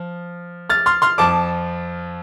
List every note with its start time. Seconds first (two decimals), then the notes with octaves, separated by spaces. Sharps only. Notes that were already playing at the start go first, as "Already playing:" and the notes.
Already playing: F3
0.70 F6 A6
0.86 C6 F6
1.02 C6 F6
1.18 F2 F3 A5 D6